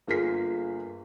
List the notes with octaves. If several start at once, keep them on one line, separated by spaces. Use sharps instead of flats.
G1 A#3 F4 G#4 B6